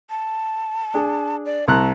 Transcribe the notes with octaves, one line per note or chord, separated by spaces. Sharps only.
A5
D4 G#4
D5
C2 A5 A#5 F#6